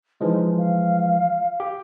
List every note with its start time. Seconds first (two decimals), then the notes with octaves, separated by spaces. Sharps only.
0.21 E3 F3 G#3 D#4
0.58 F5
1.60 G4